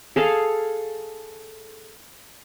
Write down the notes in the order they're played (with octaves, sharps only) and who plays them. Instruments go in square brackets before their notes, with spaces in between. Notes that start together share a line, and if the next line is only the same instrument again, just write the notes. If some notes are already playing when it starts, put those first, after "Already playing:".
[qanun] G#4 A4 F5